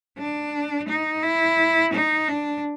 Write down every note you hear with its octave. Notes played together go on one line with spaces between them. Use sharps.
D4
D#4
E4
D#4
D4